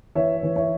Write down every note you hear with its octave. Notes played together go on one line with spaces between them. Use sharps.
E3 C#5 E5
E3
C#5 E5